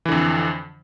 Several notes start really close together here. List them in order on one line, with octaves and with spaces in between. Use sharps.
E3 D3 F2